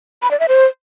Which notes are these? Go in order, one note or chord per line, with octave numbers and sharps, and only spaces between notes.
B5
D5
E5
C5